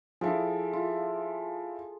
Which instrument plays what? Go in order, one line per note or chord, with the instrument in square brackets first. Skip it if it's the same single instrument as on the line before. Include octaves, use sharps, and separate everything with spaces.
[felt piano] F3 E4 [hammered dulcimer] G#4 A4
[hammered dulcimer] F4